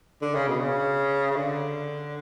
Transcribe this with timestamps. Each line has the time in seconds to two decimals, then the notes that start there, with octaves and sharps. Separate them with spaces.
0.22 D3
0.35 C#3
0.48 B2
0.61 C#3
1.31 C#3
1.36 D3